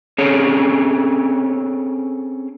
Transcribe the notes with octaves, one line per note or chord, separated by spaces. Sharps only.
C4 C#4 G#4 A4 C#5